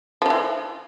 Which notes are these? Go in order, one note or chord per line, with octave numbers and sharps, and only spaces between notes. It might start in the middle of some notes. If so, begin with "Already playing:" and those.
F3
D#3
E3